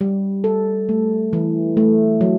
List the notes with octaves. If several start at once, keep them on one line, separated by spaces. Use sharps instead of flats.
G3
A4
A3
E3
A3
F#3